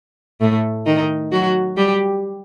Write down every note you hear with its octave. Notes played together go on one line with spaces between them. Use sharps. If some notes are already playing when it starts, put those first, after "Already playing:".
A2 A3
D#3 D#4
F#3 F#4
G3 G4